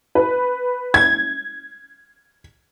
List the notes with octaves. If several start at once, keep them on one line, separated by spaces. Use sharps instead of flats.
B4
G#6